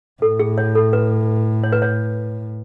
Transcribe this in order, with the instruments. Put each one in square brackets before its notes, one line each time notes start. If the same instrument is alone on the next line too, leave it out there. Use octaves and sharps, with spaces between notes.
[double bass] A2 [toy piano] A4
[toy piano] G#4
C#5
A4
B4
C#5
B4
C#5